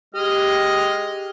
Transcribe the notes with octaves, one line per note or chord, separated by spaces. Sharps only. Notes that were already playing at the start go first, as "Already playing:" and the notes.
G#3 G4 D#5 F6